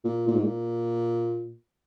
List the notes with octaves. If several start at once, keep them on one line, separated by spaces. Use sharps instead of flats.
A#2
A#2
G#2
A#2